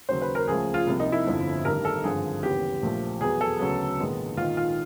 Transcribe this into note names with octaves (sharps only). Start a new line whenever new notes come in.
D#2 C#3 F#3 C5
B4
A#4
C#2 C#3 F3 A3 G#4
F4
C2 C3 F3 A#3
D#4
E4
G1 F2 D3 F3
A1 G2 D#3 G3 A#4
A4
G#1 G2 D3 F3 G#4
D#2 C#3 E3 G3 B3 G4
A#1 A#2 F3 A3
E2 B2 F#3 B3 G#4
A4
D2 C#3 F#3 B3
A#1 G#2 D#3 G#3 B3
A#1 G#2 D#3 F4
F4